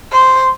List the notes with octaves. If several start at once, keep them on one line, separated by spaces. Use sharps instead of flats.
C5